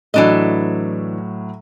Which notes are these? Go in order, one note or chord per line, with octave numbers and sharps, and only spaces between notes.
A2 E3 F#3 D4 D#5